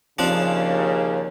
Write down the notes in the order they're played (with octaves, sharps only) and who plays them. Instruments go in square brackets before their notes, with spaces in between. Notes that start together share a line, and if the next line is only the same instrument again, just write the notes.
[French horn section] D#2 C#3 [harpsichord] F3 C4 D4